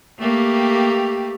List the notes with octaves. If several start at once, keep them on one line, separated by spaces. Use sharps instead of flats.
A3 A#3 G4